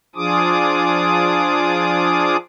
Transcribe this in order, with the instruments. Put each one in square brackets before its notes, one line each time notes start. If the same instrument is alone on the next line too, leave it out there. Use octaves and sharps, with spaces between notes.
[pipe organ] F3 D4 F4 G#4 D6 D#6